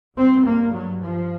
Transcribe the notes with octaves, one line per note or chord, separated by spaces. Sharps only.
G2 C4
A#3
F#3
F3